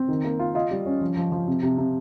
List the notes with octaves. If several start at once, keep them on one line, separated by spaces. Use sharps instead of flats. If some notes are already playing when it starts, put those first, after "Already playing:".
Already playing: C4
D#3
A#3
F4
F4 D#5
G3
C#4
F3
F3
F3
C3
C3
C3